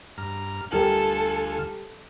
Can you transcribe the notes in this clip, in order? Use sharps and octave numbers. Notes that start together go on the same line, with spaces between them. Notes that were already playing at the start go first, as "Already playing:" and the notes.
G2 A#5 F6
D2 G3 F4 G4 A4 A#4 G#5